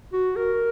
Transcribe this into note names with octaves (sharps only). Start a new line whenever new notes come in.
F#4
A#4